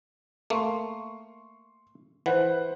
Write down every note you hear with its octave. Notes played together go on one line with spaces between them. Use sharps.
A3 A#3 C6 C#6
E3 B4 C5 F#5